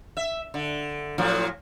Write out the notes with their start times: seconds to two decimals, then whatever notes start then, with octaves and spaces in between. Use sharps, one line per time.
0.17 E5
0.54 D3
1.18 A2 F3 F#3